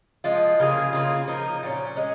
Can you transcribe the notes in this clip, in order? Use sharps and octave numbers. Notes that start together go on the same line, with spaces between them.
F3 G#3 F4
C#3 A#3 F4 G#4
C#3 A#3 F4 G#4
F3 A#3 D#4
A#2 A#3 C#4
G#3 C#4 G#4